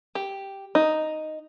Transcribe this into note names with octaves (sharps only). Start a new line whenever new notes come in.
G4
D#4